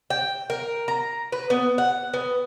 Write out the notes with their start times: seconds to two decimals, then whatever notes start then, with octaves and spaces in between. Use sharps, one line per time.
0.10 G5
0.50 A#4
0.88 A#5
1.32 B4
1.50 B3
1.78 F#5
2.14 B3